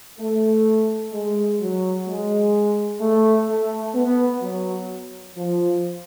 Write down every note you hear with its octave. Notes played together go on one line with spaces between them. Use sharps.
A3
G#3
F#3
G#3
A3
A3
B3
F#3
F3